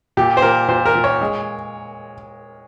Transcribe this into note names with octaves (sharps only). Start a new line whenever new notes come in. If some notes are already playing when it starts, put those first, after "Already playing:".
A#2 G4
C5
A#2 A#4
A#2 C5
A#4
A#2
C#5
G#3